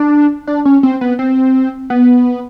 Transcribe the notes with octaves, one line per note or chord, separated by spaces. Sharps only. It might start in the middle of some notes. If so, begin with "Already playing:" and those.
Already playing: D4
D4
C#4
C4
B3
C4
B3